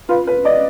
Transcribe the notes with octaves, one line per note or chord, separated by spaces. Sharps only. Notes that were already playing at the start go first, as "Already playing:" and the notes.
F4 B4
B4
D5 D#5